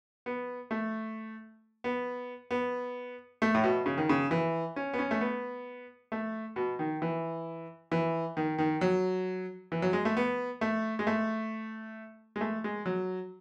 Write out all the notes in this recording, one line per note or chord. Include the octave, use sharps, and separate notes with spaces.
B3
A3
B3
B3
A3
A2
B2
C#3
D#3
C#3
E3
C#4
B3
C#4
A3
B3
A3
B2
D#3
E3
E3
D#3
D#3
F#3
E3
F#3
G#3
A3
B3
A3
G#3
A3
G#3
A3
G#3
F#3